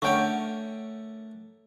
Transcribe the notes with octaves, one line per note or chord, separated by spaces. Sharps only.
D3 A3 C#4 A#4 C#5 F#5 G5 C#6